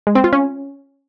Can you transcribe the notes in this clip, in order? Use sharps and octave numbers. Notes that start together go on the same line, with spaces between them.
G#3
C4
F4
C#4